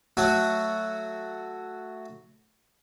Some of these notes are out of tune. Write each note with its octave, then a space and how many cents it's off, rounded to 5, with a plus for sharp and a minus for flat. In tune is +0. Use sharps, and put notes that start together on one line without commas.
F#3 +0 A3 +0 F#4 +0